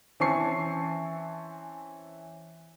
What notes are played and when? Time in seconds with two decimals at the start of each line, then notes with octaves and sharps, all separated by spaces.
0.20 E3 C4 C#4 A5 C#6 C7